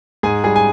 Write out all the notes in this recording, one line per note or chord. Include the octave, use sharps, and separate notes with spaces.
G#2 G#4 G#5
G3 G#4 G#5
G#5